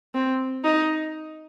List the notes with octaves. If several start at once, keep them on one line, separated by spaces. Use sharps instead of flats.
C4
D#4